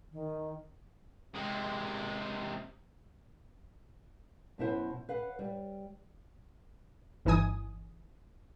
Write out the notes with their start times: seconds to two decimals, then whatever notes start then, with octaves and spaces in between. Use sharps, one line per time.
0.12 D#3
1.34 C3 G#3
4.58 F#2 B2 E4 C5 F#5
5.09 B4 F5 F#5
5.39 G3
7.25 G1 E3 D#4 G#5 D#6